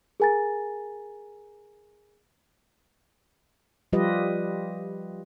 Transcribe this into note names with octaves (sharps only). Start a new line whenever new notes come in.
G#4 A#4 G#5 A#5 A6
F3 G3 F4 G4 B4 D#5